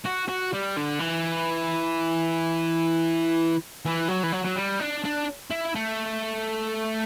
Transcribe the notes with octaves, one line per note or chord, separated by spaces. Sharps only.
F#4
F#4
G3
D3
E3
E3
F#3
E3
F#3
F#3
G3
D4
D4
E4
A3